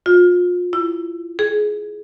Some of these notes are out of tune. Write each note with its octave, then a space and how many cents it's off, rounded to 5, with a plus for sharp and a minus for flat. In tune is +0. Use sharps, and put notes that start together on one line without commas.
F4 +35
E4 +35
G#4 +15